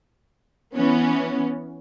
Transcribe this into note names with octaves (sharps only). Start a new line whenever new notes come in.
E3 B3 C#4